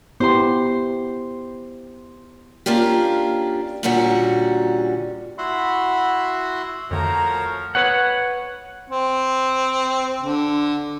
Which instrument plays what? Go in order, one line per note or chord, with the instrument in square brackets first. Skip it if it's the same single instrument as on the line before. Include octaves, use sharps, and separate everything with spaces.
[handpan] B3 E4 G4 [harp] C5 C6
[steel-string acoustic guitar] A#3 C#4 D4 F4 G4
A#2 D3 G3 C#4 F#4
[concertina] E4 F#4 E5 F#5 B5 C6
[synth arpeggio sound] F2 D3 [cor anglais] F3 [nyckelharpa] A3 A#5 [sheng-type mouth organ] F#4 A#4 C#5
[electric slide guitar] B4 C#5 F#5
[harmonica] C4
D3